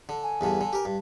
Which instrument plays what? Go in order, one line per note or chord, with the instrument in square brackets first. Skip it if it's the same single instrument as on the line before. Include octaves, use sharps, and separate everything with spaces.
[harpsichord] D3
[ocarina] G#5
[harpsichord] E2 G2 D3
D3
G4 A#4
G2